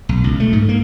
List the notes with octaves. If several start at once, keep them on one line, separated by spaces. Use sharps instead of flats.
B1
C#2
A3
G#2
A#3